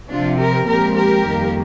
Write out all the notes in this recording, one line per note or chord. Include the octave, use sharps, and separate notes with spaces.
C3 F3 C4 D4 F4
G4 A#4
A#2 F3 G#3 C4 G4 A#4
G4 A#4
F2 D#3 G3 A#3